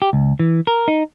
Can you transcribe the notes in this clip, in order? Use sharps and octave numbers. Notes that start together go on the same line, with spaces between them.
G4
C#2
E3
A#4
D#4